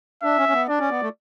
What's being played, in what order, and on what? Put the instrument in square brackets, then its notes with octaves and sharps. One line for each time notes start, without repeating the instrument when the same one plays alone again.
[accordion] D4 [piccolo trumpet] E5
[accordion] C#4
C#4
B3
[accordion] D4 [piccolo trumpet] D5
[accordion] C#4
B3
A3